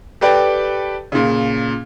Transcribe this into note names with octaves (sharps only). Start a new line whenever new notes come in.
G4 A4 B4 D5 G5
A#2 C#3